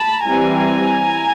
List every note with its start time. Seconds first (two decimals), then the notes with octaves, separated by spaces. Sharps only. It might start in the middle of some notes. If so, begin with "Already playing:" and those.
Already playing: A5 B5
0.26 E3 G3 C4 E4 G#5 A#5
1.03 E4